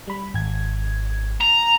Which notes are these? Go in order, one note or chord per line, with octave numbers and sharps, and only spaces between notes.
G3 B5
G#1 G#6
A#5